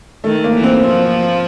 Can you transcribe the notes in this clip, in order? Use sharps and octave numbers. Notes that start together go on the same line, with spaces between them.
D#3 A3
A#3
E3
C4
F3 C4